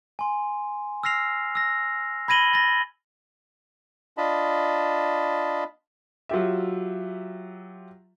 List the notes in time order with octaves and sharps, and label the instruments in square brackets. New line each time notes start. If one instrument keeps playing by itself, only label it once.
[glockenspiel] G#5 C6
E6 F6 A#6 C7 F7
E6 A#6
B5 G#6 A#6 D#7 F#7 G7
A6 A#6
[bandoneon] D4 F4 D#5 A5 B5
[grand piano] F#3 F4 G4 E5